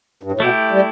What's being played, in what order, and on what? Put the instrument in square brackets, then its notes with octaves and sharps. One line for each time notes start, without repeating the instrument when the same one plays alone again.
[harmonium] G2
A2
[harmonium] B2 [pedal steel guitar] A3 E4 G4
[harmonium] G3